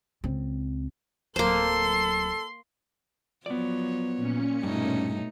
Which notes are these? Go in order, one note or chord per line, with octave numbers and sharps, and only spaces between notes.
C#2 C4
D1 F#3 A#3 A4 C5 C6
F3 F#3 B3 C#5 D5
A#2 C#4 C#7
G2 B2 A3 D#4